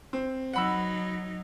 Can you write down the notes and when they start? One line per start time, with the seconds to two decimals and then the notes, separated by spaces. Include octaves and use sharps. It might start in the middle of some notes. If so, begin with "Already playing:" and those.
0.13 C4
0.53 F#3 D#4 F#5 B5 E6